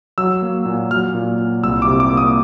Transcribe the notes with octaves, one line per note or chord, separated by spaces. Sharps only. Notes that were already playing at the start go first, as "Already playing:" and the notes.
F#3 E6
A#3
A#2
F#3 F6
A#2
A#2
C2 E6
D6
C3
D6
A#3
D#6